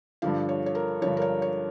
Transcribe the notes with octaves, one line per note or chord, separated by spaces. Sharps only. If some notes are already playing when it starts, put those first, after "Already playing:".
G2 D3 F3 F5
C#5
C#5
A#4
G2 D3 F3 C#5
A#4
C#5
C#5